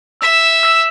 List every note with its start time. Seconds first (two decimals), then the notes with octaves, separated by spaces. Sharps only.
0.21 E5 E6 B6 E7
0.63 E6 B6 E7